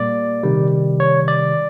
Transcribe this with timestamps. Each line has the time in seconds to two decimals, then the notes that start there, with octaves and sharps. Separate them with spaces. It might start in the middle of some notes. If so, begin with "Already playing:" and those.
Already playing: A#2 G3 A#3 D5
0.43 C3 D#3 G3
1.00 C#5
1.28 D5